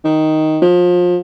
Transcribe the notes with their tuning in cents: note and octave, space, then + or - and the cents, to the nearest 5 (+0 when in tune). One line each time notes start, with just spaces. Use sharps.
D#3 +5
F3 +30